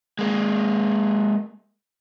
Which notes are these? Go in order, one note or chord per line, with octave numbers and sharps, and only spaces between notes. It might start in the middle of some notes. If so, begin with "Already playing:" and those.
G#3 A#3